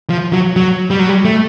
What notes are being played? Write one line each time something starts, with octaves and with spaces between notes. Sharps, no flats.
F3
F#3
F#3
G3
F#3
G3
A3